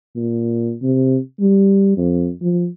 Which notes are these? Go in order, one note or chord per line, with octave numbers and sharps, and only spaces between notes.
A#2
C3
G3
F2
F3